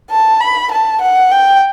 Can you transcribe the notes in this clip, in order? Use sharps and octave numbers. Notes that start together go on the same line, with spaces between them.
A5
B5
A5
F#5
G5